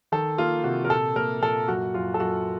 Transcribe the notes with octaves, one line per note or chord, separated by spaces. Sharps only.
D#3 A4
A#3 F4
C3 F#4
A#4
A#2 A4
A#3 A#4
A#2 A4
F#2 F#4
F#2 F4
A4
F#2 F#4